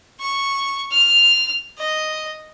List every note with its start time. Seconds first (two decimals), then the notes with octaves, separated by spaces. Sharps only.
0.20 C#6
0.92 F6
1.78 D#5